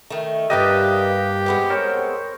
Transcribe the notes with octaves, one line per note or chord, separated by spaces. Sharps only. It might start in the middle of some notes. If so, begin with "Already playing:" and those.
D#3 A3
G2 G3 A#3 F4 G4 B4 D#5
G#3 B3 C4
A#4 C5 C#5